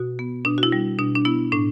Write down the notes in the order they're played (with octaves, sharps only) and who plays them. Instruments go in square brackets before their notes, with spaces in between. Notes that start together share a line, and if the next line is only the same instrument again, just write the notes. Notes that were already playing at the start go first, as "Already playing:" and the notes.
Already playing: [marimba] B2 F#4
B3
B2 D4
F#4
E4
G3
B2 D4
D4
B3 E4
A2 D4